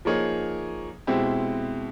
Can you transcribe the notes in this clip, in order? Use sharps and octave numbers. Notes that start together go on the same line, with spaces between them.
F3 A#3 D#4 G#4 C#5
B2 G#3 C4 E4 G4